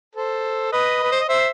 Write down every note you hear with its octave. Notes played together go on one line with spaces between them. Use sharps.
A4 C5
B4 D#5
B4
C5
D#5
C5 E5